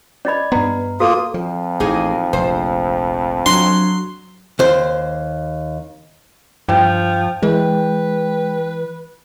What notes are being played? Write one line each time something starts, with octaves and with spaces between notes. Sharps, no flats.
C#4 D5 D#5 B5 G#6
G2 B3 B4 A#5 C6
A#3 F4 F#4 A4 D#6
F2 F3
A1 A2 A#3 D#4 G#4
F1 A#1 C5
F#3 D4 C6
D#2 C5
G2 F3 G5
E3 G#3 B4